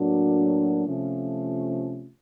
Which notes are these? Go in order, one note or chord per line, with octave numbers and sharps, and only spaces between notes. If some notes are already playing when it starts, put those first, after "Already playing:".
Already playing: A2 F#3 A#3 D4 F#4
C3 F3 A3 C#4 F4